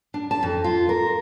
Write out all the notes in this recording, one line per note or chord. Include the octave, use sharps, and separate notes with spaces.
D4
A5
F2
F4
A#4